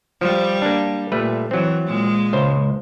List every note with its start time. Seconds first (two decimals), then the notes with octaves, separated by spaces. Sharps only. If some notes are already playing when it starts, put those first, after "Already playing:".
0.21 F3 G3
0.62 A#3 D4
1.12 A#2 G3 A3 B4
1.51 E3 F#3 C4
1.87 A#2 G#3
2.33 C#2 C5